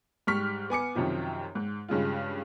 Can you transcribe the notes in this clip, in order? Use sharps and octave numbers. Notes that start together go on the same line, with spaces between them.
G#2 G3 C#6 F6 B6
B3 G#5 D6 C#7
F#2 C3 D#3 F3
G#2
G2 C#3 G#3 F4